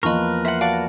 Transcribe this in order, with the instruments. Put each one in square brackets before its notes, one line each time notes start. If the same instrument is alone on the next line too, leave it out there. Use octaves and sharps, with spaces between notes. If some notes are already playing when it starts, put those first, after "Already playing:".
[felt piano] E2 F3 A#3 [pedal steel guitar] A#4 B4 [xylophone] D#5 C#6
[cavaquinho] C5 F#5 [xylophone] E5
[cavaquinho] F#4 D5 A5 [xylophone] F5